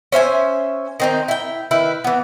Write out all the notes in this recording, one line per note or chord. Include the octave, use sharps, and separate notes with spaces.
C#4 C5 E5 G#5
D#3 C4 D#4
E4 G5
D#3 E4 B4
E3 B3